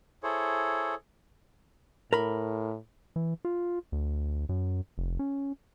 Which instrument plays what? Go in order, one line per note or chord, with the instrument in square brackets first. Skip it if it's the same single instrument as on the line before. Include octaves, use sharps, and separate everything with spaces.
[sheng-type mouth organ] E4 G#4 A4 C5 C#5
[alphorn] A2 [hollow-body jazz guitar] A#4 B5
[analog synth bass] E3
F4
D2
F#2
F1
C#4